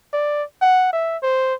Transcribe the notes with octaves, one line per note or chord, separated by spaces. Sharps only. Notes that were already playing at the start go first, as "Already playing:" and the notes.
D5
F#5
E5
C5